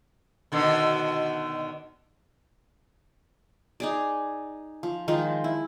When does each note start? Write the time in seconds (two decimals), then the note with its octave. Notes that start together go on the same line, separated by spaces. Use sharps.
0.52 B2 D3 D#3
3.80 D#4 G#4 D5
4.83 F3
5.08 D#3 F3 G#3
5.44 E4